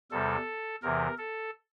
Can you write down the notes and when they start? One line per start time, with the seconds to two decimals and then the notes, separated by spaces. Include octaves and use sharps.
0.11 E2 C3 G3 A4
0.82 E2 C3 E3 A#4
1.18 A4